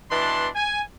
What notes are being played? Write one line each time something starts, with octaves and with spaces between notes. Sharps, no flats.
B2 E3 D4 A5 C6
G#5